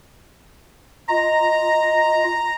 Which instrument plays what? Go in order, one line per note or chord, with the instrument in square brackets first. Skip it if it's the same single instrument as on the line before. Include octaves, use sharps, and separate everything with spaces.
[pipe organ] F4 D#5 [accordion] A#5